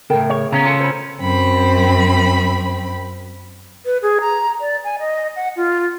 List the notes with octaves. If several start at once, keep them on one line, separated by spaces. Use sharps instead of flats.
A2 C#3 A4 A#4 G5
G#4 C#5
C#3 B3 C#4 A#5
F4 A4 F#5
C5 B5
F#2 C4 B5
B4
G#4
A#5
D5
G#5
D#5
F#5
F4